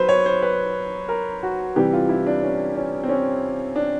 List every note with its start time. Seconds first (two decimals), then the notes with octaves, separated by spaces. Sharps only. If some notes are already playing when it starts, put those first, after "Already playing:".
Already playing: F#3 B4 C5
0.09 C#5
0.26 C5
0.42 B4
1.09 A#4
1.43 F#4
1.76 C3 E3 G3 G4
1.93 F4
2.09 E4
2.27 D4
2.43 C#4
2.75 C#4
3.04 C4
3.09 C#4
3.76 D4